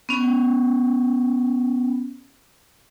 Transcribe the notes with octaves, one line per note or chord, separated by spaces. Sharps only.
B3 C#4